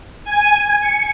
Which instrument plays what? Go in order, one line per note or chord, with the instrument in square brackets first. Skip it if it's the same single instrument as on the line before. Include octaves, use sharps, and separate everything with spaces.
[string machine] G#5
C#7